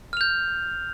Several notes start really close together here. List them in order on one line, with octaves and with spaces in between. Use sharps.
F6 F7 G6